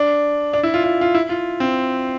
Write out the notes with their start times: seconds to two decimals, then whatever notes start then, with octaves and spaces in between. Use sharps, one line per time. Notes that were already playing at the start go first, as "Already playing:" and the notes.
Already playing: D4
0.53 D4
0.63 E4
0.74 F4
0.84 F4
1.01 F4
1.14 E4
1.29 F4
1.60 C4